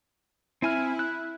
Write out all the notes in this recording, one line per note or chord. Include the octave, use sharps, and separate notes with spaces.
C4 E4 G#5 F6
F#6